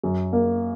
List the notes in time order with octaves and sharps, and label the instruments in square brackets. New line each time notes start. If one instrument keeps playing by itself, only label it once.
[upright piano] F#2
A#3